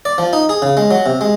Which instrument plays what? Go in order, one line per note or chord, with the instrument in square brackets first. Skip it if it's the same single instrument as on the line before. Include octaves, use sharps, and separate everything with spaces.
[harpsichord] D5
F3
D#4
G#4
C#3
G#3
F#3
C3
G#3